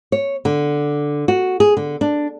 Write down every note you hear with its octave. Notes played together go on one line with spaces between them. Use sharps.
C#5
D3
F#4
G#4
D3
D4